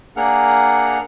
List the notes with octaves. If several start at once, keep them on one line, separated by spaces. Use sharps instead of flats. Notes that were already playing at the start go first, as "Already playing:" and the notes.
A#3 D4 G#4 A#4 F#5 F6